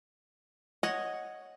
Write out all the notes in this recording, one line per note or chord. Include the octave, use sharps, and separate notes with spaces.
C#5 D#5 F#5